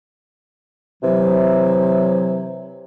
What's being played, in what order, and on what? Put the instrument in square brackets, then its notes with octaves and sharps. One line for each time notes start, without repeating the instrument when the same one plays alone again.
[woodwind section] C3 E3 F#3